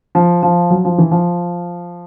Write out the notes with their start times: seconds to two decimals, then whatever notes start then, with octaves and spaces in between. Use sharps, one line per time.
0.15 F3
0.43 F3
0.70 F#3
0.85 F3
0.98 E3
1.11 F3